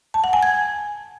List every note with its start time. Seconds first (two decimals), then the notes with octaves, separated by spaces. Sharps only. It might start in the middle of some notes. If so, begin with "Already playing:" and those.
0.14 A5
0.24 F#5
0.33 G#5
0.43 G#6